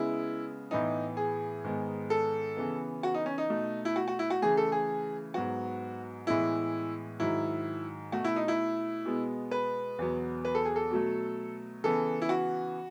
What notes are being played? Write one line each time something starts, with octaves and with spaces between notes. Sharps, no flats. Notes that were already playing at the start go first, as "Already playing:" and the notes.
Already playing: C#3 G#3 B3 E4
A2 E3 B3 D#4
G#4
G#2 D#3 G#3 B3
A4
C#3 E3 B3
F#4
D#4
C#4
D#4
B2 A3
E4
F#4
F#4
E4
F#4
C#3 E3 A3 G#4
A4
G#4
G#2 F#3 B3 F#4
A2 E3 G#3 B3 E4
G#2 D#3 F#3 E4
B2 A3 F#4
E4
D#4
E4
B2 G#3 B3
B4
E2 B2 F#3 B3
B4
A4
G#4
A4
B2 F#3 A3
C#3 E3 B3 A4
E4
F#4